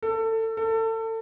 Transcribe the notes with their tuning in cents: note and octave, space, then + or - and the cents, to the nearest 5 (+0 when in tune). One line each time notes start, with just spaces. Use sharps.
A4 +25
A4 +30